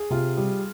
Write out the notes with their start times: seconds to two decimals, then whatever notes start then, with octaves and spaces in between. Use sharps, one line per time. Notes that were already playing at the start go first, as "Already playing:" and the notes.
Already playing: G#4
0.10 C3 F4
0.37 G3